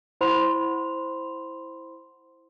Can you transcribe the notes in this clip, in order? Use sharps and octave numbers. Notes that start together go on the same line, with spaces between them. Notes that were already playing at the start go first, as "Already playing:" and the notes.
E4 C5 F#5 B5 C6 F7